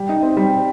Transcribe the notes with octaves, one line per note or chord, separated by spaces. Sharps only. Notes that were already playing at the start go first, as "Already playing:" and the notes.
Already playing: G3
D#4
C4
G3